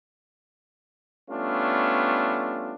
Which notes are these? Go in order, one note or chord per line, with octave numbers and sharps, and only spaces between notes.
G3 A3 B3 C#4 D4 F4